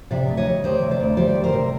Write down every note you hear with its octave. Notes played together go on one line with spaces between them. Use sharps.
C3 D5 E5
D2
C#5 D#5
G3
D#3 C5 D5
C3
C5 D5
D2
G3 C5 D5
D#3
A#4 C5
C3